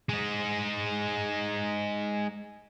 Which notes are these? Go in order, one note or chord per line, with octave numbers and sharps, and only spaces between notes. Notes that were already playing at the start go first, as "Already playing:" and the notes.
G#3 D#4